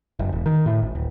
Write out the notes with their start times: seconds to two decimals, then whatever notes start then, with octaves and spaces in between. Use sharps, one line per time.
0.19 F#1
0.32 E1
0.46 D#3
0.66 A2
0.82 G#1
0.95 D1